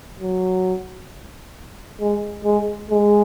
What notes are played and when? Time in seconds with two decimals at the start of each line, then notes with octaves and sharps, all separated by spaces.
0.20 F#3
2.01 G#3
2.45 G#3
2.91 G#3